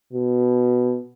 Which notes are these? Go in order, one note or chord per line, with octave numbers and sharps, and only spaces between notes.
B2